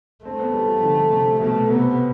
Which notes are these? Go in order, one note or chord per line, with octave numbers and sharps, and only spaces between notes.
A3 C4
B3
G3
F3
D3
C3
B2 A3
C3 B3